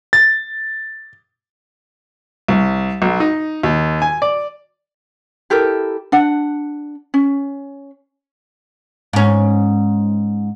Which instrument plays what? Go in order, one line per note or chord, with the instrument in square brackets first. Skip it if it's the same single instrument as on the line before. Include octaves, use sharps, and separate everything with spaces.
[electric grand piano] A6
[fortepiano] C2
B1
D#4
D#2
G#5
D5
[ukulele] E4 G4 A4 A#4
D4 F#5
C#4
[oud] G#2 C#4